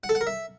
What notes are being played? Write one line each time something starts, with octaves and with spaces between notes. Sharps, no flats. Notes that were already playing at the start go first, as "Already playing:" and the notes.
F#5
A4
F#5
A#4
E5